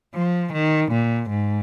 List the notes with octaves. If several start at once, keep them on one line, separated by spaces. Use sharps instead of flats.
F3
D#3
A#2
G#2